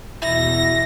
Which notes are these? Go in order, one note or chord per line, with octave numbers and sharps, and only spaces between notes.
E2 B2 E4 A#6